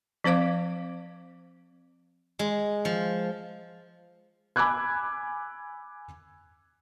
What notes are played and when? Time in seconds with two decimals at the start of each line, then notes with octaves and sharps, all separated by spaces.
0.24 F3 C4 C5 F5 D6
2.39 G#3
2.85 F3
4.56 G#5 B5 D6 E6 F#6 G#6